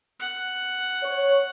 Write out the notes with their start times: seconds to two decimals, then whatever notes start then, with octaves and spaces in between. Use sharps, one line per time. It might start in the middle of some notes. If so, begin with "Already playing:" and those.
0.20 F#5
1.03 C#5